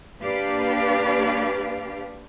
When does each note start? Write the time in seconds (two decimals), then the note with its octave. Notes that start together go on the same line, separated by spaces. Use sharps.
0.23 A#3 D4 G4 B4 D5 F5